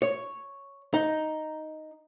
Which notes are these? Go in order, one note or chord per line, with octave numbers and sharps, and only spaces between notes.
C#5
D#4